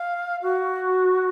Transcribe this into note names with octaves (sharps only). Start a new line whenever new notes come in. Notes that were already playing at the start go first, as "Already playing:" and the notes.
Already playing: F5
F#4